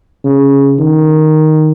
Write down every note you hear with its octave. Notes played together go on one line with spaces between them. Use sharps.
C#3
D#3